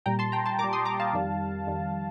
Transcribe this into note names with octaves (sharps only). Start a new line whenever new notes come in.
A#2 G3 G5 A#5
A5 C6
G5 A#5
A5 C6
A#2 A#5 D6
G3
C6 D#6
A#5 D6
F5 A5
F2 D#3 G3
F2 D#3 G3